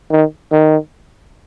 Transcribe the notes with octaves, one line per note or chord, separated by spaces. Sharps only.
D#3
D#3